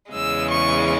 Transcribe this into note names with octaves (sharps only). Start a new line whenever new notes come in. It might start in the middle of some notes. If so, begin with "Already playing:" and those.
E2 C#3 E3 G#3 E6
C#6